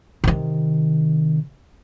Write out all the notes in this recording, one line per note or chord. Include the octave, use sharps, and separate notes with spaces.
C3 D#3